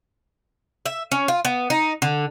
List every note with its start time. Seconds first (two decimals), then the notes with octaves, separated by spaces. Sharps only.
0.86 E5
1.12 C#4
1.28 F4
1.45 B3
1.70 D#4
2.02 D3